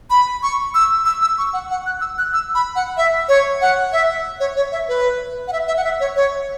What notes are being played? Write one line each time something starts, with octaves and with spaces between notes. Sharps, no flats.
B5
C#6
E6
E6
E6
C#6
F#5
F#5
F#6
E6
F#6
E6
B5
F#5
E5
C#5
F#5
E5
C#5
C#5
E5
B4
F#5
E5
E5
F#5
E5
C#5
C#5